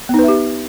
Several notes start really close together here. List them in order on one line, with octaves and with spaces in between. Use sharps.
B3 D#4 B4 E5 G4